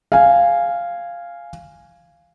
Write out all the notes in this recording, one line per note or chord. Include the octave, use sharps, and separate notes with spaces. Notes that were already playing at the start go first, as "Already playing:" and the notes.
F5 G#5